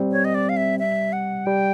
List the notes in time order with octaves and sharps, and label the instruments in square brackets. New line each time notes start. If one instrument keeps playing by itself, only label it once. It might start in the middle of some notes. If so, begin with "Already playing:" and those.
Already playing: [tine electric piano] G3 C4
[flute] C#5
D#5
D5
F5
E5
E5
F#5
[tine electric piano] G3 [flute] G5